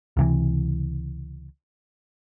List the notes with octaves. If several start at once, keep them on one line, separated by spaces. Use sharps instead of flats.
C#2 C3 E3